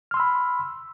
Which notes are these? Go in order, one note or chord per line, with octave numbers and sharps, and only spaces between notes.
B5 C6 E6 F6